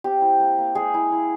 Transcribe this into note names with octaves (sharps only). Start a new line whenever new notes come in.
C4 G4
E4
A#3
A#3
G#3 G#4
E4
E4